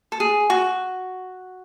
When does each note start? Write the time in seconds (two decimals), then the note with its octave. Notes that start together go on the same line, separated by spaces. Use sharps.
0.12 A4
0.20 G#4
0.50 F#4